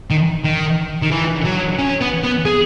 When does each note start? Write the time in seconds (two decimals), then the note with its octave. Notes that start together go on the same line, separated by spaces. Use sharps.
0.10 D#3
0.44 D#3
1.02 D#3
1.11 E3
1.45 F#3
1.79 C#4
2.01 B3
2.24 B3
2.45 G#4